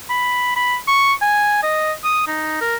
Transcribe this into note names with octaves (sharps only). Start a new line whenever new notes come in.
B5
B5
C#6
G#5
D#5
D#6
D#4
A#4